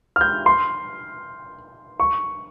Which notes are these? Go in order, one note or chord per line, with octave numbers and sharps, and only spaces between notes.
F6
G6
C6
C#6